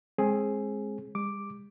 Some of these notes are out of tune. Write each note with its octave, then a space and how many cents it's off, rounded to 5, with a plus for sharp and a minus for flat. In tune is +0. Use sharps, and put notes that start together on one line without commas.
G#3 +0 C4 +35 G#4 +10
G3 +45 D6 +0